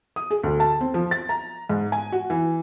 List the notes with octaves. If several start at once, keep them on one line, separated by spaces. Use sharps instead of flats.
D#6
G#4
D2
A5
C4
F3
A6
A#5
G#2
G#5
F#4
E3